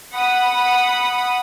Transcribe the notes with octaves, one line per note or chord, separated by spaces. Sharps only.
F#5 B5 D#6